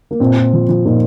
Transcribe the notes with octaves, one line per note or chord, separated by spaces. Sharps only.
A#3
A#2 C4
A#2
F3
F3
A#2 D#4